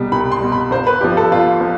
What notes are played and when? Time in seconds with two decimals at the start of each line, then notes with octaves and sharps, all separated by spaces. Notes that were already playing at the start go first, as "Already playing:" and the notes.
Already playing: C2 B2 G3
0.12 C2 B5
0.32 C6
0.41 B2 G3
0.52 B5
0.71 G1 C5
0.87 B4
1.01 G2 F3 G4
1.17 A4
1.32 G1 F4
1.61 F3